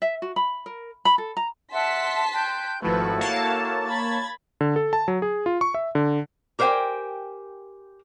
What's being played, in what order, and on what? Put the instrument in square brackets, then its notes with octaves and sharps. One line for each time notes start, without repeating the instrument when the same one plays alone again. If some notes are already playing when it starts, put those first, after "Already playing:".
[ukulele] E5
F#4
B5
A#4
B5
A4
A#5
[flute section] E5 F#5 [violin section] A5 C6 B6
[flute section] G5 F#6 G6
[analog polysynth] G#1 F3 A3 [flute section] E4 F#4 A4 [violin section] B4
[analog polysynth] A#3 C#5 A5 [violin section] F5
[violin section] B5 G#6 A6
[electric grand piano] D3
A4
A5
F#3
G#4
F4
C#6
E5
D3
[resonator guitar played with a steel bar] G4 A#4 C5 E5 G5 G#5